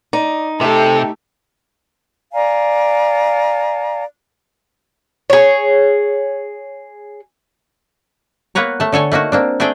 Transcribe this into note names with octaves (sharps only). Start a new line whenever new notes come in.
D#4 D5
C3 A3 G4 A4
D5 F5 G#5 A#5
G#4 C#5
A#3 B3 B4 C#5 A#5
A3 A5
D3 A4 C#5 G#5
A3 A#3 D#4 F#4
A#3 C4 D4
A3 C4 D4 G#4 D5 G5